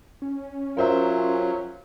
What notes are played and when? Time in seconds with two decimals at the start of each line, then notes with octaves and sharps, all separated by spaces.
0.22 C#4
0.77 F#3 F4 A#4 C5 E5